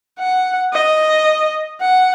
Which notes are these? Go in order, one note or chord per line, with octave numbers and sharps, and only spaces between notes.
F#5
D#5
F#5